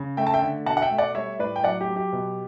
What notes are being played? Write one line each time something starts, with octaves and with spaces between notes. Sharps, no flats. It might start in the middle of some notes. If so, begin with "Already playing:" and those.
Already playing: C#3
A3 E5 G5
A5
E5 G5
D3
B2 F#5 A5
F#5
E5 G5
A3
D5 F#5
G3 C#5 E5
A2 B4 D5
G5
F#3 D5 F#5
G4
F#3
G4
B2